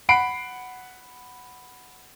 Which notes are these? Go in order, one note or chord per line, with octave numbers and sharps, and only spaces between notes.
F#5 B5 C7 D7